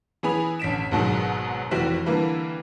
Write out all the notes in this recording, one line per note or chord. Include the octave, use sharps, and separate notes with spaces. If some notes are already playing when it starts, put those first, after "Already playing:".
E3 B3 G#4 G#5 B5 F7
A1 D3 B6 D7 E7
G#1 G#2 B2 D#3 F#3 G#3
F1 E3 F#4 G4 C5 B6
D3 E3 G3 A#3 B4